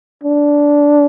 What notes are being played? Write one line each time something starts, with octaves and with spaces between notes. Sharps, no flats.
D4